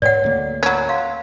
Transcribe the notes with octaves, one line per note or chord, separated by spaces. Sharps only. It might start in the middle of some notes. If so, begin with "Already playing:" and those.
G#2 B4 C#5 D5 F#5
D2 A3 A#3
F#3 C#4 B5
F5 C6